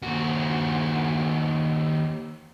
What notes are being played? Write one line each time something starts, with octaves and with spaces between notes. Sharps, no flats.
D#2 F#4